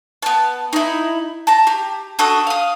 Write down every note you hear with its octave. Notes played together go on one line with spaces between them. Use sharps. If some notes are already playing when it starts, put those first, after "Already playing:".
B3 A5
D#4 E4
A5 A#5
G4
D4 F#4 A4 D#6
F5 D#6